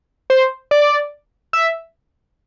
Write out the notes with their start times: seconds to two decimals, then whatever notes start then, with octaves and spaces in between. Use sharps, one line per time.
0.30 C5
0.71 D5
1.53 E5